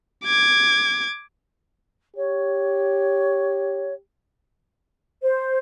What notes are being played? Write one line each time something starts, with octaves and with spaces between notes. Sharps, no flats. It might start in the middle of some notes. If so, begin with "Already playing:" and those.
D6 G#6
G4 C#5
C5